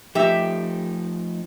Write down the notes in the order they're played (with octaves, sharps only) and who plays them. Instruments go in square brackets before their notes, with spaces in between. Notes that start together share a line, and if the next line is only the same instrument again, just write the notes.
[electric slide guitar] F3 A3 D#4 [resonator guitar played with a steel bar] G4 E5